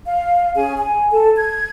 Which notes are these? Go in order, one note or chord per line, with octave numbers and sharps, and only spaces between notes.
F5
C#4 G#4 G#5
G#5
A4 A5
G#6